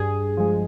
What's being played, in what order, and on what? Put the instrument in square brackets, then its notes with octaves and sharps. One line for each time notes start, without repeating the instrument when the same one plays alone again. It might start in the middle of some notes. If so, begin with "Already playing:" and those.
Already playing: [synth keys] G2 G#4
F3 G#3